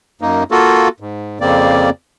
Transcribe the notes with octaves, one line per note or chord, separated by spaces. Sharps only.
F#2 A#3 D#4
A#3 F4 F#4 A4
G#2
F2 C#3 A#3 C4 D5